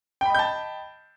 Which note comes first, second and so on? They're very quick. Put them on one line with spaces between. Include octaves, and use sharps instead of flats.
G5 B5 D#5 G6 A5